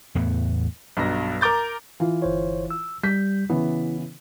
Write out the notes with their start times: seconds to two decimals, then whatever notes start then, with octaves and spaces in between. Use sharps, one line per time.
0.15 E2 A2 B3
0.97 B1 G2 F#3 A#6
1.41 A#4 A#5 D6 G6 A6
2.00 E3 F4
2.22 G1 C5 C#5
2.70 E6
3.03 G3 G6 B6
3.50 C#3 E3 B3 E4